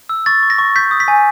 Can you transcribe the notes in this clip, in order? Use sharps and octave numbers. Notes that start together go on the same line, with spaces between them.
E6
C#6 A6
C#6
A#6
C#6
G6 B6
D#6
B6
G#5